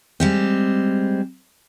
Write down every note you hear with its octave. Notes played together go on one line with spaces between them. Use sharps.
G3 G#3 C4